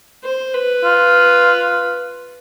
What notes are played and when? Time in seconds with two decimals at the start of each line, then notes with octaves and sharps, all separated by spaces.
0.23 C5
0.54 B4
0.84 F4